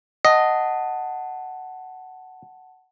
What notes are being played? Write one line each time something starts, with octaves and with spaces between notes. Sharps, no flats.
D#5 F#5 A5